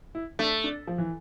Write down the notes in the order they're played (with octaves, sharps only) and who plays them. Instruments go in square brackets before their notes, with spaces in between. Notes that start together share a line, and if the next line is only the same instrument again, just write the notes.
[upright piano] E4
[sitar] A3 [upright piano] D4
[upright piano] D4
F3
E3